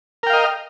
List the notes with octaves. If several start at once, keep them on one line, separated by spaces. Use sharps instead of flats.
A#4 D#5 F5 G5